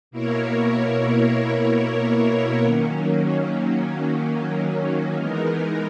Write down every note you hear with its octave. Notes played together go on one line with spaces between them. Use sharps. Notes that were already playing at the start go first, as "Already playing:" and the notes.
B2 A#3 E4 A#4 C#5
D#3 F#3 A#3 C#4
E3 G#3 B3 D#4 A#4